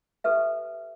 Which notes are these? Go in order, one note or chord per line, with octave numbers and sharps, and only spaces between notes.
G4 A4 B4 E5